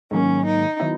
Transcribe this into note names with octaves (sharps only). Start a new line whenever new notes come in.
G#2 D#3 F#3 A#3 C#4
D#4
D#3 F#3 B3 E4